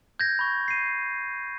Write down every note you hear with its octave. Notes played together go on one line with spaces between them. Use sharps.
G6 G#6 A#6
B5 C#6
C7 D#7